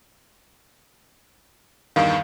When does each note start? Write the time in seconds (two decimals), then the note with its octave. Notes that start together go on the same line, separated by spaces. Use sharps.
1.96 E2 G2 D#3 F5